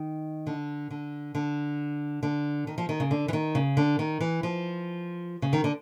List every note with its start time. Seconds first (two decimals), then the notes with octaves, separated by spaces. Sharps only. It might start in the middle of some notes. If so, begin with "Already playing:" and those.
Already playing: D#3
0.47 D3
0.90 D3
1.35 D3
2.23 D3
2.67 D#3
2.78 F3
2.89 D#3
3.00 C#3
3.11 D3
3.28 E3
3.33 D#3
3.55 C#3
3.77 D3
3.99 D#3
4.20 E3
4.43 F3
5.42 C#3
5.53 D#3
5.64 D3